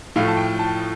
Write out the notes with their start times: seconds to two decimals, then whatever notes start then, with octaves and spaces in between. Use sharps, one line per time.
0.16 A2 F3 A3 F5
0.28 A5
0.37 G5
0.59 A5